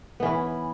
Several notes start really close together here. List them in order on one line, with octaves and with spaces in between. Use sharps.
B3 E3 C#4